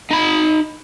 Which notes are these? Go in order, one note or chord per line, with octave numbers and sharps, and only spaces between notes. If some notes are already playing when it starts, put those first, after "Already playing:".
D#4 B5